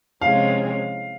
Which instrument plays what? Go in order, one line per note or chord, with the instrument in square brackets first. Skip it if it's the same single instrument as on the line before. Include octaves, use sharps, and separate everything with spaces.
[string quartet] C3 F3 G#3 C#4 F4 [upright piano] F5